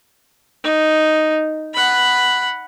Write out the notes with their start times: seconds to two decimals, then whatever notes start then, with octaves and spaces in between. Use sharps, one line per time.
0.64 D#4
1.74 F#5 B5